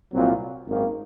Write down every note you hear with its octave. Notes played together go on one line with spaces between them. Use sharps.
C2 A#2 F#3 C4 F4
G#1 F#2 D#3 A#3